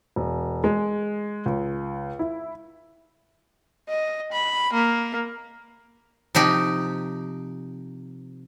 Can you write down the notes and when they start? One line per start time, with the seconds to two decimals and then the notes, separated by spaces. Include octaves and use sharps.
0.16 E1
0.64 G#3
1.46 C#2
2.19 E4
3.89 D#5
4.33 B5
4.74 A#3
6.35 C3 F3 D#4 G4